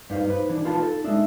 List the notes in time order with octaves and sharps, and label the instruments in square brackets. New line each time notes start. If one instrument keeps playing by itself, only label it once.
[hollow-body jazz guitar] G2 D#4 F5 [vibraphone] B4 C5
[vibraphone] D#4 [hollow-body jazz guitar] B4
[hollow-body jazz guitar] E3 D4
F4 B4 A5
A4
[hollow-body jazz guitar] G#3 D4 [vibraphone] D#4 E5 E6